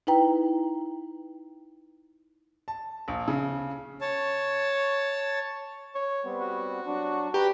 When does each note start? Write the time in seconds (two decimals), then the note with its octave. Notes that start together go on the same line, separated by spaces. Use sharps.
0.07 D#4 E4 B4 G5 A#5
2.68 A5
3.08 A#1
3.28 C#3
4.01 C#5 A5
5.95 C#5
6.24 G3 B3 C4
6.41 F#4
6.87 F#3 D4
7.34 G4 B4 A#5